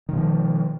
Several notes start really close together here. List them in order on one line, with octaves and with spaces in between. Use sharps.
D#3 B2 F3